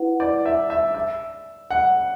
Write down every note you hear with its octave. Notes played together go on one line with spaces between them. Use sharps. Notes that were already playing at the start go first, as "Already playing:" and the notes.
Already playing: E4 B4 F#5
D5
E5
E5
E5
F#5